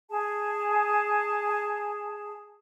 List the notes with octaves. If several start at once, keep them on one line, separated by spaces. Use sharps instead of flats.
G#4 A5